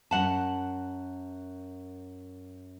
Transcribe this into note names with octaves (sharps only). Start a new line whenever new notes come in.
F#2 F#5 A5